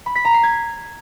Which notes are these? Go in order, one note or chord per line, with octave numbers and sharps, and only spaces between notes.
B5
B6
A#5
C7
G#6